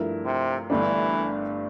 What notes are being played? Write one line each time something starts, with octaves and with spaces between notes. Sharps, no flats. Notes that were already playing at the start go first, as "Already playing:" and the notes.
Already playing: G2 F3 A3 E4 A#4
C3
G1 G2 D3 E3 A3 D4